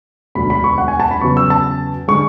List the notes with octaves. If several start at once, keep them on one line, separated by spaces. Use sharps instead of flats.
E1 D2 D3 A3 B5
B5
C#6
F#5
G#5
A5
B5
E2 C#3 F#3 C#6
E6
A5
D3 G#3 C#6